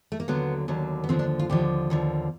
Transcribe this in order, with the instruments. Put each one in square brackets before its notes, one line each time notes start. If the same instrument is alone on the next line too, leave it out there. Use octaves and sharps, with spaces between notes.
[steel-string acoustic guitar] A3
A#3
D#2 D3 F#3 B3
D#2 D3 F#3
B3
D#2 D3 F3 C4
D4
F4
D#2 D3 F3 G4
D#2 D3 F3